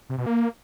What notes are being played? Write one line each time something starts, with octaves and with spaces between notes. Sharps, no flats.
C3
B2
A#3